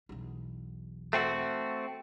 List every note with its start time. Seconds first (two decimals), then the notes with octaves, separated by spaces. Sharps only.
0.09 B1 E2
1.13 A3 C4 F#4